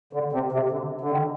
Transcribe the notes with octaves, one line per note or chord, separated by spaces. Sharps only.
D3
C3
C3
D3
D3
D#3